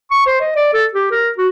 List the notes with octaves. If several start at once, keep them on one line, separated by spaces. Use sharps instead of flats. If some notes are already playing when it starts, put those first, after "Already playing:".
C#6
C5
D#5
D5
A4
G4
A#4
F#4